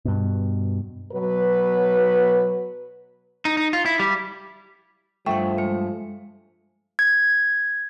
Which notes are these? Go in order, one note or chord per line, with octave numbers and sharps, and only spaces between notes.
G2 B2
B2 F#3 B4
D#4
D#4
F4
E4
G3
G2 F3 A3 E5 F#5 G5 C#6
G#3 C5
G#6